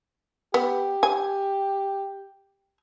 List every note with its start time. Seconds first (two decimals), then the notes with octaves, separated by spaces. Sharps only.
0.54 B3 G4
1.03 G#5